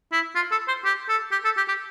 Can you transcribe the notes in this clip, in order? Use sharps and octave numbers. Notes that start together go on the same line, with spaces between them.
E4
F4
A4
C5
G4
A4
G4
A4
G4
G4